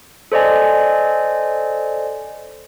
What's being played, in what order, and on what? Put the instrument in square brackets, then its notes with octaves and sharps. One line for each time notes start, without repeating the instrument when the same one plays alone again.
[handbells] A4 C5 D5 D#5 G#5